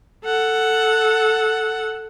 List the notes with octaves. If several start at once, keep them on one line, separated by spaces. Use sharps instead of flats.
A4 F#5